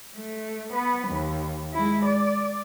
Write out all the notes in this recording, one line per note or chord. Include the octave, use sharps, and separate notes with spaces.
A3
B3 B4
D#2
G#3 E4
D5